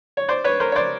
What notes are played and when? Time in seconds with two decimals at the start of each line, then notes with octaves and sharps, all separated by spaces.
0.17 C#5
0.28 C5 D5
0.44 B4 C#5
0.60 A#4 C5
0.72 C#5
0.76 C5 D5